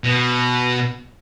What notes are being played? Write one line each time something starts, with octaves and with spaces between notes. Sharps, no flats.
B2